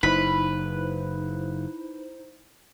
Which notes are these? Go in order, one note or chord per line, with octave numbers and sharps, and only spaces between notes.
F#1 D#4 E4 B4 C5 B5